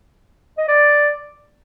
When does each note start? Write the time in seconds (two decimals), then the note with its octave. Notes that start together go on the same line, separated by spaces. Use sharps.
0.58 D#5
0.68 D5